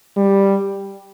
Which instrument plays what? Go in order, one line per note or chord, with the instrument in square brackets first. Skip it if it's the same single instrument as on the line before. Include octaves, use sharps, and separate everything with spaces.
[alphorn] G3